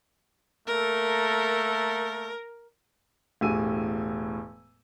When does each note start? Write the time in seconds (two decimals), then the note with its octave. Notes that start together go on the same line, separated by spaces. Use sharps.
0.67 A3 A#3 A4 A#4
3.41 E1 A2 G4 G#5 E6 D#7